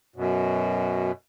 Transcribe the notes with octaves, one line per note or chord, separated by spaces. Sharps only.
F#2 B2